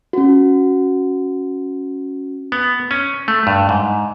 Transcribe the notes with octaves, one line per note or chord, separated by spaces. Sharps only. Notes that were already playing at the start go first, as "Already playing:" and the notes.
C#4 F#4
B3
C#4
A3
G2
G#2